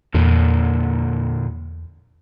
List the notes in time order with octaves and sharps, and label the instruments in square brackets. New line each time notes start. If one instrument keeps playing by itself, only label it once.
[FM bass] E2 [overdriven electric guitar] A#2 D3